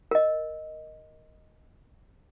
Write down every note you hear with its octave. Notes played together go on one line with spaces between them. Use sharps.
A#4 D#5